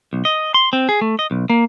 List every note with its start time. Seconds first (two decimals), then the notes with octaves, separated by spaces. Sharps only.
0.13 B1
0.25 D#5
0.54 C6
0.73 C4
0.89 G#4
1.01 A3
1.19 D#5
1.31 B1
1.50 A#3